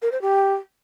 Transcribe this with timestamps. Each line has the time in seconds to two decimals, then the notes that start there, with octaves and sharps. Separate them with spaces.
0.02 A#4
0.12 C5
0.22 G4